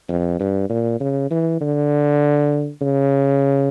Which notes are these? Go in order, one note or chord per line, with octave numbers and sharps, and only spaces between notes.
F2
G2
A#2
C#3
E3
D3
C#3